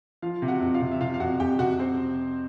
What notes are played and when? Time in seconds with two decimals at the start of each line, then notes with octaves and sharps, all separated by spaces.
0.22 F3 F4 F5
0.42 C3
0.48 F#4 F#5
0.61 F2
0.74 F4 F5
0.81 C3
0.91 E5
1.01 C3 F4 F5
1.14 F5
1.20 F2 F#4 F#5
1.40 F2 G4 G5
1.59 C3 F#4 F#5
1.79 C4 C5